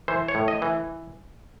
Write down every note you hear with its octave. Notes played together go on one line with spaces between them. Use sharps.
E3 C5
C#5
A2
D#5
E3